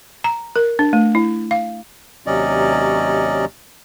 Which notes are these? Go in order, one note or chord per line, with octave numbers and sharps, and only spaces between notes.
A#5
A#4
D4
A3
E4
F5
D#2 C3 F#3 C#4 D5 D#5